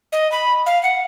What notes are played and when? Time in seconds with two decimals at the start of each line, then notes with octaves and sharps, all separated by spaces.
0.12 D#5
0.32 B5
0.66 F5
0.83 F#5